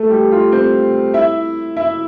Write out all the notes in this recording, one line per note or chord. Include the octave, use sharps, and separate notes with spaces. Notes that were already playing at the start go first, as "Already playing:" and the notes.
Already playing: A3 A4
G3 G4
F4
C4 C5
E4 E5
E4 E5